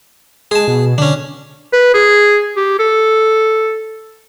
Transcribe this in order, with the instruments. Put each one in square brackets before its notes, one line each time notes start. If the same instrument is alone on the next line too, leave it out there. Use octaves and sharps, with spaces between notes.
[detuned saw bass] G#3 [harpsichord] G#4 A5
[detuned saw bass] B2
[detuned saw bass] D3 [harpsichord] C#4 D4
[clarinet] B4
G#4
G4
A4